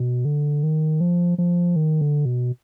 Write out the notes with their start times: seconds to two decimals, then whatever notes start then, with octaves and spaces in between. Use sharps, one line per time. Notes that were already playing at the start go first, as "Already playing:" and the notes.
Already playing: B2
0.25 D3
0.63 D#3
1.01 F3
1.38 F3
1.76 D#3
2.01 D3
2.25 B2